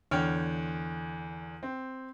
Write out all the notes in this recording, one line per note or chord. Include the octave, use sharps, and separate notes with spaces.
E2 D3 C#5 G5 F6
C4